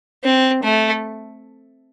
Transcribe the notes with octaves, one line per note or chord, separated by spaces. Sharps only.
C4
A3